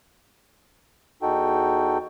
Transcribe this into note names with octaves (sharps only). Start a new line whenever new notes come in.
E2 D#4 F#4 A4 G5